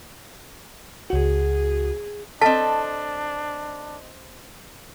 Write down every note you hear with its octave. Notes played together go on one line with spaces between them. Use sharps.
C#2 F#4 G#4
C4 D4 A4 D#5 A5 B6